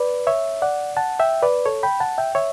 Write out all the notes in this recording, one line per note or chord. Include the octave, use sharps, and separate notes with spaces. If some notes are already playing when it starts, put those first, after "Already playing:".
Already playing: B4 D5
C#5 E5
D5 F#5
F#5 A5
E5 G5
B4 D5
A4 C#5
G5 B5
F#5 A5
E5 G5
C#5 E5